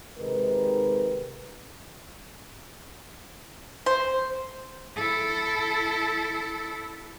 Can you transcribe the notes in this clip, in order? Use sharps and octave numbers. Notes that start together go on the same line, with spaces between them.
C3 D#3 G#3 D#4 A#4 B4
C5
E4 A4